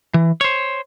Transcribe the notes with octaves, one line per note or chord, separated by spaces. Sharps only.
E3
C5 C#5